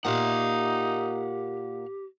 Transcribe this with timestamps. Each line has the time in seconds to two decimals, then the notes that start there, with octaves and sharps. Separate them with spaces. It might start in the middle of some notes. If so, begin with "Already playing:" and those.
0.05 A#2 A#3 D#4 G4 F5 F#5